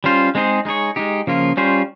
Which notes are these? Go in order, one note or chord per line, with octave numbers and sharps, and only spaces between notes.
G3 C#4 F4 C5
G#3 C4 D#4 G#4 C5
G#3 D#4 G#4 C#5
G#3 D#4 G4
C#3 F3 A#3 F4
G3 C#4 F4 C5